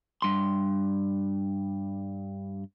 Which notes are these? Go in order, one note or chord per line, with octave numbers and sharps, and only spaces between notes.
G2 C6